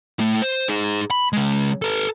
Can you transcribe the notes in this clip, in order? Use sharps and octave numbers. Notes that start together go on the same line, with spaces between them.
A3 E4
C5
D#4 G#4
B5
C#3 G#3
A4 B4